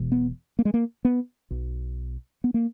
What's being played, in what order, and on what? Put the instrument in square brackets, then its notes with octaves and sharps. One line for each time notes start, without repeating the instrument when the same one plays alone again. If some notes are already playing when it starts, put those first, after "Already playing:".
Already playing: [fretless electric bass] E1 E2 B2
B3
A#3
G#3
A#3
B3
B1 B2
B3
A#3